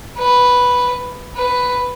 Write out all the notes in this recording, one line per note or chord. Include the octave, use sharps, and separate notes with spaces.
B4
B4